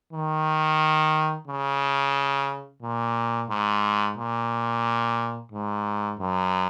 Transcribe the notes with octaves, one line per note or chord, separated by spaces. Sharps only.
D#3
C#3
A#2
G#2
A#2
G#2
F#2